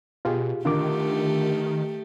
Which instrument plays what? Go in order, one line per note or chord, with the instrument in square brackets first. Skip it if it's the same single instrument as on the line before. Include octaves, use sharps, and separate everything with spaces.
[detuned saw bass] B2 [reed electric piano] F4 G4 G#4
[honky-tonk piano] D3 [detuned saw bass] D#3 [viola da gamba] A3 G4 [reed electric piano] F4 A#4 D6